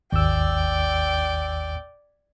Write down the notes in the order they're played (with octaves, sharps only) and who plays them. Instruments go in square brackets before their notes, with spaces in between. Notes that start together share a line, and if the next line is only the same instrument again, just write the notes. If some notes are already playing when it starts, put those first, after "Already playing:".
[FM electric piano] G#1 E6 [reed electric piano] D#2 [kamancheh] D5 G5